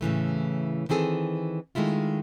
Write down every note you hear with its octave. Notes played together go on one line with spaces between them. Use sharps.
A2 C#3 E3 A3
D#3 E3 C4 G#4 A4
D#3 G#3 A3 E4 F4